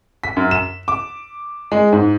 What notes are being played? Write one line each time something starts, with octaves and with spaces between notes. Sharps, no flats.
B6
F#2
E7
D6
G#3
G#2